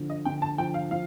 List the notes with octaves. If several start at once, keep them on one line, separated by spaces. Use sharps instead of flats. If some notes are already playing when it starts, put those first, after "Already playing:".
Already playing: D3 F3
D#5
D3 G5
A5
F3 G5
F5
F3 F5